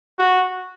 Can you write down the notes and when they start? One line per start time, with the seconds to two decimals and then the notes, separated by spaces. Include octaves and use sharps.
0.19 F#4